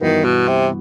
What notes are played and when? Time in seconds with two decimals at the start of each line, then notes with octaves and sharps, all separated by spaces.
0.01 G2 D#3 E3 B3 F#4
0.25 B2
0.48 C3